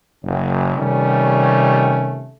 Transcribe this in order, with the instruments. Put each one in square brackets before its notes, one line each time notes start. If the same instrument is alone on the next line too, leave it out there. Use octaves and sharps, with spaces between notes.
[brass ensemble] F#1
C3 D#3 G3 A3 C#4